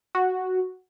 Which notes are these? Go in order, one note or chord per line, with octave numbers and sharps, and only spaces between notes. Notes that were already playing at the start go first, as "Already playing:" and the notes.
F#4